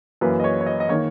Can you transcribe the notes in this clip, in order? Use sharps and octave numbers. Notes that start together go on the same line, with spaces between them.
F#2 E3 A#3 B4
D#5
C#5
C#5
D#5
D#5
D#3 A#3 C#5